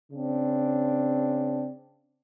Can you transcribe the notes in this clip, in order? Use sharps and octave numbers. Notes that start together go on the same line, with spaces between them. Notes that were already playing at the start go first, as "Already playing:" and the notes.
C#3 C4 D4